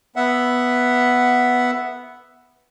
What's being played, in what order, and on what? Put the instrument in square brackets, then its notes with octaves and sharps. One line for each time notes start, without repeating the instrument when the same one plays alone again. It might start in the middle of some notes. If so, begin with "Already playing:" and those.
[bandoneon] B3 E5 F#5